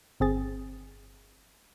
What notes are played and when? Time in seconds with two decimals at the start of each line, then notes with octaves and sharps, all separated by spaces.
0.20 G1 C4 G#4 A6